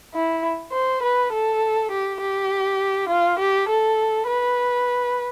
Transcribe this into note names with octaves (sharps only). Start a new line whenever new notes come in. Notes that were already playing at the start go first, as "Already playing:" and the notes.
E4
C5
B4
A4
G4
G4
F4
G4
A4
B4